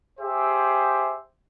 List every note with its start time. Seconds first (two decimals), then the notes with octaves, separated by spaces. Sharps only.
0.20 G4 G#4 C5 E5